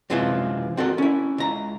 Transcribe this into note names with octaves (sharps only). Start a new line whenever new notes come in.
F#2 C3 E3 F3 G#3 F4
C4 F#4 A4 A#4
C#4 E4
C#2 A#5